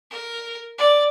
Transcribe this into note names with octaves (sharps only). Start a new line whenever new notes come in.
A#4
D5